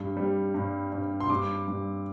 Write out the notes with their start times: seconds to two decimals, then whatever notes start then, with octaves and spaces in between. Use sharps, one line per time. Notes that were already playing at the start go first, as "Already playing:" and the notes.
Already playing: G2
0.17 G3
0.54 G2
0.92 G2
1.20 C6
1.30 G2 D6
1.68 G2